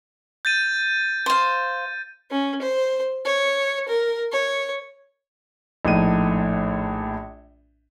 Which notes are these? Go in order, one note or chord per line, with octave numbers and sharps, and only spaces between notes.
G6 A6 D#7
C5 F5
C#4
C5
C#5
A#4
C#5
A#1 A2 D#4 D#7